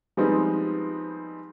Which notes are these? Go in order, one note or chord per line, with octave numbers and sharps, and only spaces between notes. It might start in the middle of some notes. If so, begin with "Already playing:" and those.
F3 G3 G#3 B3 C4 D#4